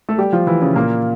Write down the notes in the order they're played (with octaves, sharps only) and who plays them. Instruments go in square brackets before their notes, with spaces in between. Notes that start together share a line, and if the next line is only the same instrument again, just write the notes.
[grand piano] A3 A4
G3 G4
F3 F4
E3 E4
C#3 C#4
A#2 A#3